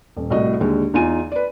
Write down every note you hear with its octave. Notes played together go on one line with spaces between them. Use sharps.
D#1
C2 A2 F#4 D#5
D#2 D3 G#3
E2 D#4 F4 G#5 D#7
B4 D5